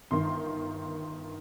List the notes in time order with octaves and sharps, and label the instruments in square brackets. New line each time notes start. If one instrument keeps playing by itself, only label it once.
[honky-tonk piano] G1 G2 D#3 C6